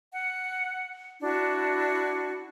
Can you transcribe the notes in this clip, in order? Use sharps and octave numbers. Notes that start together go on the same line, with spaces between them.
F#5
D4 E4 F#4